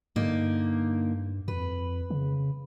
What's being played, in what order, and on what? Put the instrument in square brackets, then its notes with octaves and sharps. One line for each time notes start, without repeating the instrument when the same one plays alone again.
[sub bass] G2 [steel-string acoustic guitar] D3 A#3 D#4
[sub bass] F2 [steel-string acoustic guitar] B4
[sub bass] C#3